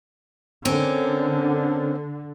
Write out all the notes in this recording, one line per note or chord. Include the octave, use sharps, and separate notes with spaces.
D3 C4 C#4 A#4